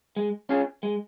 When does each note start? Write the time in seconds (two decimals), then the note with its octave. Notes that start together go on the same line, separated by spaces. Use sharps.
0.16 G#3
0.49 C#4 F4 G#4
0.83 G#3